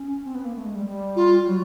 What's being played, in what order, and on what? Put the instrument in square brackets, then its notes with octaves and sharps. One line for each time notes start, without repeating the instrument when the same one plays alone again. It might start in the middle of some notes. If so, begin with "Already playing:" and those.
Already playing: [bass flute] C#4
C4
B3
A#3
A3
G#3
G3
G3
[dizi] F4
[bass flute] F#3